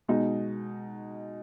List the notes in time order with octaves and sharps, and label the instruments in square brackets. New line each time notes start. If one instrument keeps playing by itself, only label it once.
[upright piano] B2 G#3 D#4